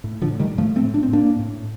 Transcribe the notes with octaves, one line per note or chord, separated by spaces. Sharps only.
A2
D3 F3
A2
D#3 G3
A2 F3 A3
A3 C4
A2
D4
C4
A2 A#3 D4
A2